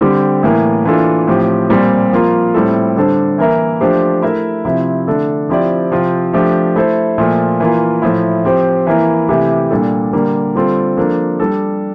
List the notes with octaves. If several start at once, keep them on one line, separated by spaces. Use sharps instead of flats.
D3 G3 C4 G4
A2 E3 A#3
E3 A#3 D4 F4 A4
A2 F3 C4 G4
A#2 G3 C4
F3 A#3 F4
A2 G3 C4 E4 A4
D3 G3 D4 A4 C5
E3 A#3 E4 A#4 E5
F3 A3 D4 G4 C5
A3 E4 A#4 E5
C3 F3 C4 E4
D3 A3 D4 A4
F3 C4 E4 G4 D5
C3 F3 C4 F4
F3 A3 D4 G4
A3 E4 A4 C5
A#2 F3 A3
E3 A#3 F4
A2 F3 A3 E4
F3 C4 G4 C5
E3 A#3 E4 A#4
C3 E3 A3 E4 G4
A#2 G3 D4 A4
D3 G3 A#3
D3 G3 C4 F4 A4
F3 A#3 D4 A4
G3 D4 A4